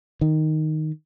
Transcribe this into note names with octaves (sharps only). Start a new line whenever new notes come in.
D#3